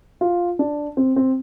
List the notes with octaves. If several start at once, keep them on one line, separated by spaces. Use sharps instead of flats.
F4
D4
C4
C4